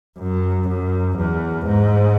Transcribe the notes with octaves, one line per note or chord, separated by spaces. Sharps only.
F#2
F#2
E2
G#2